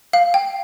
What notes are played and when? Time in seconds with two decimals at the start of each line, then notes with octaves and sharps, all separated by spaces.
0.13 F5
0.34 G5